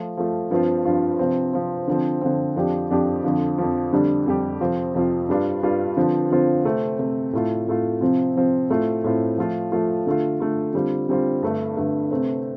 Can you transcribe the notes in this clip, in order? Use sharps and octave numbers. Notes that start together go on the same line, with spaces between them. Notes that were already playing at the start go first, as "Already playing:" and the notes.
Already playing: F3 A3 F4
F3 A3 F4
G2 F3 C4 F4
G2 F3 C4 F4
C3 F3 C4
C3 F3 C4
D3 F3 C4
D3 F3 C4
F2 F3 D4 G4
F2 F3 D4 G4
F2 D3 F3
F2 D3 F3
F2 D3 G3 D4 G4
F2 D3 G3 D4 G4
F2 C3 F3 C4 F4
F2 C3 F3 C4 F4
G2 G3 D4 F4
G2 G3 D4 F4
D3 F3 C4 F4
D3 F3 C4 F4
C3 A3 C4
C3 A3 C4
A2 A3 F4
A2 A3 F4
C3 F3 C4 F4
C3 F3 C4 F4
A2 A3 C4 F4
A2 A3 C4 F4
F3 A3 F4
F3 A3 F4
D3 A3 F4
D3 A3 F4
D3 G3 C4 F4
D3 G3 C4 F4
G2 D3 A3
G2 D3 A3
C3 A3 C4